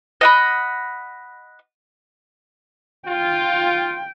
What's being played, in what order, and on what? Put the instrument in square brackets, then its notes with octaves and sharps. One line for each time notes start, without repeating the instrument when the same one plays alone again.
[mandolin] D#5 F#5 B5
[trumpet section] F4 [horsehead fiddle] G5